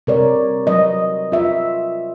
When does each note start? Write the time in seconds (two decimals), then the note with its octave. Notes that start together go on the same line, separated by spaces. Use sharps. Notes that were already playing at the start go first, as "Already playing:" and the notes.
0.07 C3 G3 A#4 C#5 D5
0.67 F#3 D#5
1.32 F4 E5